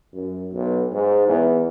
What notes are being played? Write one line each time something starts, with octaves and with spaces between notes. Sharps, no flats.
F#2
B1
G#2
E2